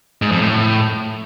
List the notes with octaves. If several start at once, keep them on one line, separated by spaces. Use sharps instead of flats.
G#2
F2
A2